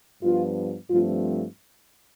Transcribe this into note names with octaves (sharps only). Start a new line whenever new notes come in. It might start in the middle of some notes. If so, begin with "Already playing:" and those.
G2 F3 B3 F4
G2 F3 A3 C4 F4